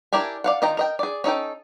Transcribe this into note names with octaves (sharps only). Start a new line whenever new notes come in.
D4 E4 G4 A#4 G#5
D5 F5 F#5
D#3 F4 D#5 G5 A#5
A#4 D#5 G5
G#4 D5
C#4 D#4 A4 G5